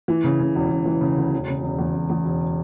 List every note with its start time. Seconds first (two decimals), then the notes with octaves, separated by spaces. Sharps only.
0.08 E3
0.24 C#3
0.40 C#3
0.55 E1
0.70 E1
0.86 E3
1.01 C#3
1.17 D2
1.33 E1
1.48 C#3
1.63 E1
1.79 E2
1.95 E1
2.10 E2
2.25 E1